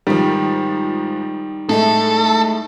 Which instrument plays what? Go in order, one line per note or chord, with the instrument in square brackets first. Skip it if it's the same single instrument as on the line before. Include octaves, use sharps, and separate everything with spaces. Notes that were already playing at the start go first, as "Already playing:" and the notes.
[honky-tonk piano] G#2 F3 [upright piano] D#3 G3
[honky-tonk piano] A2 G#3 A3 [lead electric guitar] A4